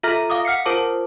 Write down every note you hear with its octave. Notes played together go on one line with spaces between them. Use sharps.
F4 A4 E5 A#5 F6 A#6
F5 D6 D#6
F#5 F6 C7 C#7
F4 A#4 C5 A5 D6